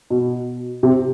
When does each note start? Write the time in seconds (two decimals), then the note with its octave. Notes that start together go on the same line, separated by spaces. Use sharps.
0.10 B2
0.83 C3